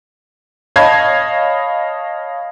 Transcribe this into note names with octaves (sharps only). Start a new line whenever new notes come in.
C#5 D#5 F5 A5 B5 G#6